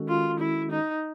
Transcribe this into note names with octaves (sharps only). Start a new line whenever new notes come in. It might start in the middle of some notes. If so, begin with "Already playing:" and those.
Already playing: D#3 G#3 C#4 F#4 A4
F4
E4
D#4